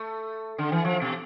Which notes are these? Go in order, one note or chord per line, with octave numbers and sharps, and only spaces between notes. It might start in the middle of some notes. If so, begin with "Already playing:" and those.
Already playing: A3
D3
E3
F3
B2